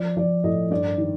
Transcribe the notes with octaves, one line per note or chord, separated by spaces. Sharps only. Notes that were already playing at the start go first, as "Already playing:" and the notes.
Already playing: F3 D5
F3 D5
A2 D#5
G2 D5
D#3